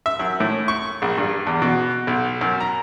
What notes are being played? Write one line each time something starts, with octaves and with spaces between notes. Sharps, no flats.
E5
F#2
A2
C#6
A#1
G2
E2
B2
B1
F#2
A#5